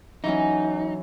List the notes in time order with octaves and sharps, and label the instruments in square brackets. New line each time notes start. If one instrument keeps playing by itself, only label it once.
[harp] E3 F#3 C#4 [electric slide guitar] D#4